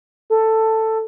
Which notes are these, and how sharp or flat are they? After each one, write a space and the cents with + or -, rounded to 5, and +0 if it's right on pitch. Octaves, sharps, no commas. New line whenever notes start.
A4 +10